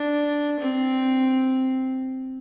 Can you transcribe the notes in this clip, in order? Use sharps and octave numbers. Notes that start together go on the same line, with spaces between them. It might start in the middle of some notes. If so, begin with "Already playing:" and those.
Already playing: D4
C4